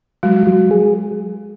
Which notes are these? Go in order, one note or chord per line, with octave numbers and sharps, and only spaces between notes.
F#3 G#3
F#3
G#4